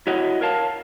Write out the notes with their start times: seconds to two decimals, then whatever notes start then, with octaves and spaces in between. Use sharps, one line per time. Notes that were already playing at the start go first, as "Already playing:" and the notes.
0.07 E4 F#4 C#5 D#5 F#5
0.41 A#4 C#5 F5 A5